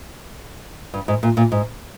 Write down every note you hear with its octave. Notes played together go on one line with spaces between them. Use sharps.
G2
G#2
A#2
A#2
G#2